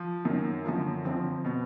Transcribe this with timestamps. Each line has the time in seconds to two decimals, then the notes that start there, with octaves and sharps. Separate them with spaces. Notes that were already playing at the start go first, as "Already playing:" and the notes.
Already playing: F3
0.25 F#2 D#3
0.65 F#2 D3 F3
1.05 F2 D3 F3 C4
1.45 B2